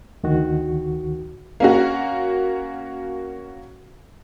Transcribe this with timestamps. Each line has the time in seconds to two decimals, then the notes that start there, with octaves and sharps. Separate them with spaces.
0.23 D2 D#3 F#4
1.60 A#3 C#4 F#4